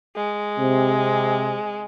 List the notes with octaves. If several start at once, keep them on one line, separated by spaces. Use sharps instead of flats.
G#3
C3